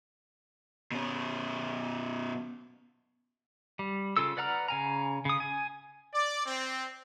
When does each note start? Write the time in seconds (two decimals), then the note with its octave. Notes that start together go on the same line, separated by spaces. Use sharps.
0.92 B2 C#4
3.79 G3
4.17 C#3 F4 A4 E6
4.37 B4 D5 F#5 A#5 F6
4.68 C#3 G#5 A#5
5.25 C#3 D#6
5.40 G#5
6.13 D5
6.45 C4